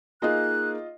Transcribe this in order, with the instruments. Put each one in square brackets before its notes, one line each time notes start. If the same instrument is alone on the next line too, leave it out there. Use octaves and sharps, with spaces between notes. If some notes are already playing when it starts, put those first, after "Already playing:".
[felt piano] A#3 D#4 G#4 [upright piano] F4 D#5 [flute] F#6